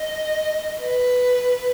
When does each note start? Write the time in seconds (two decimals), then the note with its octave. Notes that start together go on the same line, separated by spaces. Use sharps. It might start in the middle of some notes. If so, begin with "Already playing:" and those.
Already playing: D#5
0.80 B4